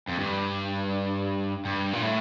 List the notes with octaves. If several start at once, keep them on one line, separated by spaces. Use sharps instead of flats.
F2
G2
G2
A#2
A2